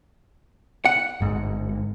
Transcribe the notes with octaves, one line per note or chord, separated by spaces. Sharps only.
F#5
G1 G#2